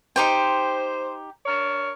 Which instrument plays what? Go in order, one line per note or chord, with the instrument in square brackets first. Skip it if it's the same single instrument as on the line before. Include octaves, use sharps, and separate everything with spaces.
[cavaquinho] D#4 G4 G5 [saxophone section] C5
[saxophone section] D4 A#4 C#5